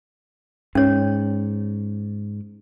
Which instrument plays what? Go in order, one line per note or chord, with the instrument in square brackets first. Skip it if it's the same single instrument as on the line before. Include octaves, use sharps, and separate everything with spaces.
[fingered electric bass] G#2 [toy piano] C#4 C#5